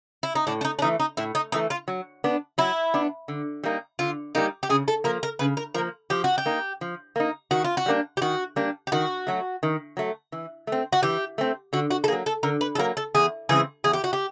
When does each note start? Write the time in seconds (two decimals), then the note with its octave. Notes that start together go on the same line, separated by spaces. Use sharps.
0.23 E4
0.35 D#4
0.47 A2 D4
0.61 D4
0.65 D#4
0.79 D4
0.82 E3 A3 D#4
1.00 D#4
1.17 A2 E4
1.35 D#4
1.52 E3 A3 D#4
1.70 F4
1.88 F#3
2.24 B3 D4
2.58 F#3 E4
2.94 B3 D4
3.28 D3
3.64 G3 A#3 D#4
3.99 D3 F4
4.35 G3 A#3 D#4 G4
4.63 G4
4.69 C#3 G#4
4.88 A4
5.04 F3 A#3 A#4
5.23 A#4
5.39 C#3 B4
5.57 A#4
5.74 F3 A#3 A#4
6.10 F3 G4
6.24 F#4
6.38 G4
6.46 A#3 D#4
6.81 F3
7.16 A#3 D#4
7.51 D#3 F#4
7.64 F4
7.77 F#4
7.86 G3 A#3 D4
8.17 G4
8.21 D#3 F#4
8.56 G3 A#3 D4
8.87 G4
8.92 D#3 F#4
9.27 F#3 A3
9.63 D#3
9.97 F#3 A3
10.32 E3
10.67 A3 C4
10.93 F#4
11.03 E3 G4
11.38 A3 C4
11.73 D3 F#4
11.91 F#4
12.04 A4
12.08 F#3 A#3 G#4
12.26 A4
12.43 D3 A#4
12.61 B4
12.75 A4
12.78 F#3 A#3 A#4
12.97 A4
13.15 E2 G#4
13.49 C#3 E3 G#3 C4 G#4
13.84 E2 G#4
13.93 G4
14.04 F#4
14.13 G4